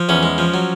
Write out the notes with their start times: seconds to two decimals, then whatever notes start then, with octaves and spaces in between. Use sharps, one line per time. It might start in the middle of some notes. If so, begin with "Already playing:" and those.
Already playing: F3
0.09 E2 C#4
0.23 G#3
0.38 F3
0.54 F#3